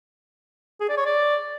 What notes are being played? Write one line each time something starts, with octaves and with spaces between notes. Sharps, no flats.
G#4
D5
C#5
D5